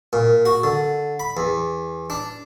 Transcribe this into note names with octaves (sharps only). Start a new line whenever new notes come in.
A#2
F#4
D3
B5
E2
D4